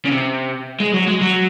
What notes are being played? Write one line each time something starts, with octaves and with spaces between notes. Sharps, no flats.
C#3
C3
G#3
F#3
G#3
F#3